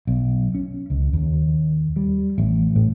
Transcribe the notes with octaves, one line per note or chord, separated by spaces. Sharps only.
B1
C#4
C#2
D#2
G3
A1
A2